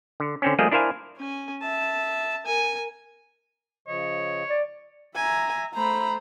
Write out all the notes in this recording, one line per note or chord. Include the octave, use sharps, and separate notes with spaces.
D3
D3 C4 C#4
F3 G3 A3 A#3 G#4 D#5
D4 E4 A#4 C5 F5 G#5
C#4 G#5
E5 A5
A#4 G#5
C#3 F3 C#5 D#5
D5
E5 G#5 A#5
A3 C5 A#5 B5